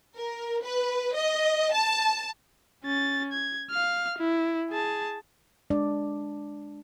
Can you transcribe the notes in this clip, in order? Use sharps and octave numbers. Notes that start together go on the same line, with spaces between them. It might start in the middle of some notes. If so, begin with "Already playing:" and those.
A#4
B4
D#5
A5
C#4 A6
G#6
F5 F6
E4
G#4 A5
G#3 D4 D5